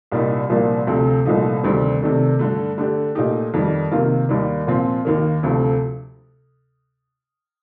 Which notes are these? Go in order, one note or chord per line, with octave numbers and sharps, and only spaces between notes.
C2 A#2 G3 A#3 D#4
C2 A#2 F3 A#3 D4
D2 C3 F3 A3
C2 A#2 F3 A3 D#4
D2 C3 D#3 G3 C4
C3 D#3 A3 D4
G2 D3 A3
D3 A3 D4 G4
A#2 A3 D#4 G4
F2 D#3 G3
C3 D#3 A#3 F4
D#2 D#3 G3
A#2 F3 C4
D#2 D#3 A#3
D2 C3 F3 A3